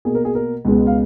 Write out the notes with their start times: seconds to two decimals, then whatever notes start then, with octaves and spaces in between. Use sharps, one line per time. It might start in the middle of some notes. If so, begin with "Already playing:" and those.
0.05 B2 A#3 G#4
0.15 A#4
0.25 G#4
0.35 A#4
0.65 C#2 B2 G#3 B3
0.87 F5